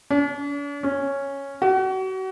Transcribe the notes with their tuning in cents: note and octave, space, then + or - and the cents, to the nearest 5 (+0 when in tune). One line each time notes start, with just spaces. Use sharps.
D4 -45
C#4 -5
F#4 +35